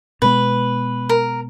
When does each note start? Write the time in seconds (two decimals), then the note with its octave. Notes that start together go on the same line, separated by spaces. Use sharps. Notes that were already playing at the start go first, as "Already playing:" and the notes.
0.22 B2 G#3 B3 B4
1.09 A#4